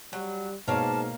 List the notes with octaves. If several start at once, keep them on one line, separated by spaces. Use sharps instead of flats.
F#3 G3
G#2 B2 A#3 C#5 F5 A5